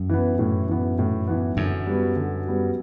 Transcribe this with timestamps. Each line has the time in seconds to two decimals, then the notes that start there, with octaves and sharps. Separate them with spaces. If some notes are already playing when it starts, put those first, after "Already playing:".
Already playing: F#2
0.10 E3 B3
0.39 A2
0.69 E3 B3
0.99 A2
1.28 E3 B3
1.57 F#2 D3
1.87 G3 B3 F#4
2.16 D3
2.45 G3 B3 F#4